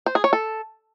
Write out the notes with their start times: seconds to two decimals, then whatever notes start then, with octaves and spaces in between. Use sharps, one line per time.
0.06 C5
0.15 G#4
0.24 C#5
0.33 A4